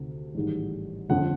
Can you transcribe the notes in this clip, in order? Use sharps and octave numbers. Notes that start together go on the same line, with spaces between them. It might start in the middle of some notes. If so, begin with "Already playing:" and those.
Already playing: D2 C3 D#3
A1 G#2 D#3 G3
G1 F2 D3 F#5